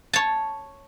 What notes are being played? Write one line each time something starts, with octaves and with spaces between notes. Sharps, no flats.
C#5 A5